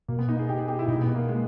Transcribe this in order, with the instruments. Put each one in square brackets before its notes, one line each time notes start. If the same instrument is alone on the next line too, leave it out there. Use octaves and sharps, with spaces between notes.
[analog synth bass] B2 [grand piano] A#3
[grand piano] B3
D#4
G#4
G4
G#4
G4
E4
[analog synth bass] B2 [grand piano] D#4
[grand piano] B3
A#3
G#3